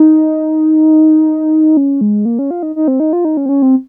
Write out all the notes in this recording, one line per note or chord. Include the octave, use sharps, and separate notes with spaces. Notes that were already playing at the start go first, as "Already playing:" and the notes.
Already playing: D#4
C#4
G#3
A#3
C#4
F4
D#4
D#4
C4
D#4
F4
D#4
C#4
C4
C#4
C4